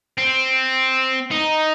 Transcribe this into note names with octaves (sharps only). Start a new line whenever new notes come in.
C4
D#4